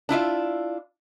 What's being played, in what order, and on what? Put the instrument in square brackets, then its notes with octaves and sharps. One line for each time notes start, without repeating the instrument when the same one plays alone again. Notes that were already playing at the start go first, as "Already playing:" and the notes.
[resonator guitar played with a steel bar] D4 E4 F4 E5